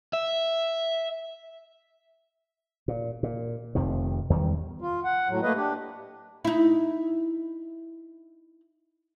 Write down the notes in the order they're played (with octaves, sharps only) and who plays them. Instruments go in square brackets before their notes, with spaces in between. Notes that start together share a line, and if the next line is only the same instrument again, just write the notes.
[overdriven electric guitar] E5
[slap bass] A#2
A#2
F1 F2 C3 D#3
E2 D#3 G3
[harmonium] F4
F#5
A2 F#3
A3 A#3 B4 D#5
D4 G4
[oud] D#4 E4